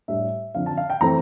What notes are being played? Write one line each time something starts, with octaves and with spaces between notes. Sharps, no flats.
A2 G3 D4 E5
D3 F3 C4 F5
A5
F5
G5
E3 A3 C4 A#5